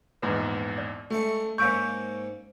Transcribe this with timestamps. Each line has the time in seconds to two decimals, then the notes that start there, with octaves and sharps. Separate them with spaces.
0.22 A#1 E2 G#2 B4
0.78 D5
1.10 C#2 A3 E5 C#6
1.58 G#2 A#3 C#4 F5 C#6 E6 G6 D7